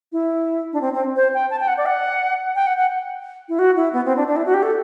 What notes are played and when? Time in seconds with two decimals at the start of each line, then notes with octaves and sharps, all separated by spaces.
0.12 E4
0.73 D4
0.81 C4
0.93 C4
1.16 C5
1.34 G5
1.50 A5
1.60 G5
1.68 F#5
1.77 D5
1.86 F#5
2.55 G5
2.67 F#5
2.78 F#5
3.49 E4
3.59 F#4
3.77 E4
3.93 B3
4.05 C4
4.17 D4
4.28 D4
4.36 E4
4.46 F#4
4.54 G4
4.63 A4